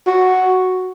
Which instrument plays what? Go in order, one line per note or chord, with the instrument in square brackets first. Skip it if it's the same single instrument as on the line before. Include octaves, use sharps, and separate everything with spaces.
[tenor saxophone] F#4